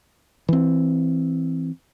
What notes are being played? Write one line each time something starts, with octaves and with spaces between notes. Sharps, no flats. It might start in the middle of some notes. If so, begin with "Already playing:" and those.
E3 C4